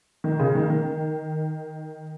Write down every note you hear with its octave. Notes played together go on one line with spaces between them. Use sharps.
D#3
C#3
D#3
D#3